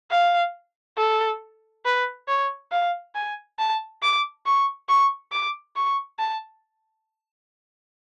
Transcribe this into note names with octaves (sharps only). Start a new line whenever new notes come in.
F5
A4
B4
C#5
F5
G#5
A5
D6
C#6
C#6
D6
C#6
A5